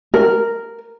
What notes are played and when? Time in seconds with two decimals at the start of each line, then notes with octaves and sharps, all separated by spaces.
0.14 A#4